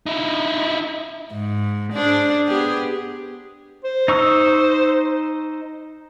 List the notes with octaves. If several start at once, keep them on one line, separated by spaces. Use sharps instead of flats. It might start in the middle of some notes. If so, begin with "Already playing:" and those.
D#4 E4
G#2
D4 G#4 C5
B3 G4 G#4
C5
D#4 C#6 E6